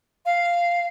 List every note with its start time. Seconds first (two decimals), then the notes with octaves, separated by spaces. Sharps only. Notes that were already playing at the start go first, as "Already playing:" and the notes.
0.26 F5